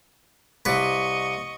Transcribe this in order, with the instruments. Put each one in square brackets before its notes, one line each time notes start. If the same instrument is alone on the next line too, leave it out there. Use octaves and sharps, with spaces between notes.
[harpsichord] C2 B4 [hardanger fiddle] D#5 C#6